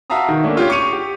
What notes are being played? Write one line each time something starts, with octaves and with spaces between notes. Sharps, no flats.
F#4 E5 F5 A5 A#5 D#6
B2 D#3
A3 A#3 C#4 D4 E4
F4 G4 C#5
C#6 D6 C#7 D#7 F7
G4